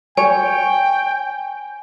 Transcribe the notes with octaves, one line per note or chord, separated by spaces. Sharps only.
C#5 G5 G#5